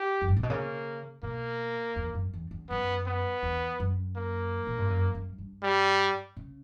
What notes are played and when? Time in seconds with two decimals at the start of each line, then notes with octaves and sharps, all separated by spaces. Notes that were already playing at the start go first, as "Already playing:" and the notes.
Already playing: G4
0.22 F#2
0.28 G2
0.37 A#2
0.43 B2
0.50 C#3 A#3
1.23 B2 A#3
1.96 E2
2.15 F#2
2.33 E2
2.51 E2
2.70 F#2 B3
3.07 B3
3.43 E2
3.80 F#2
4.17 A#3
4.67 A#2
4.78 G2
4.90 F#2
5.15 F#2
5.38 G2
5.63 G3
6.37 C#3